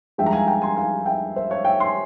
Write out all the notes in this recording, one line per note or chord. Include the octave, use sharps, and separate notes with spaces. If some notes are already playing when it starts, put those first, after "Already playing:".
G2 F3 G#3 E5 G5
A#5
F5 G#5
G5 A#5
G#5 C6
F5 G#5
E5 G5
C5 E5
C#5 F5
E5 G5
G#5 C6